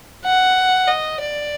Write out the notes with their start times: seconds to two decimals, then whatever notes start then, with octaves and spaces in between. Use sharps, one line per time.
0.25 F#5
0.88 D#5
1.20 D5